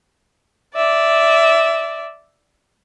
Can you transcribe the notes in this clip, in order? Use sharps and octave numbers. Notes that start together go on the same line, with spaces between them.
D5 E5